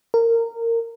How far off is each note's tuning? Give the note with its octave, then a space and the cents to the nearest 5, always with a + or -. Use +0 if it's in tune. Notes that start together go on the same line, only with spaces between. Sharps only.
A#4 -20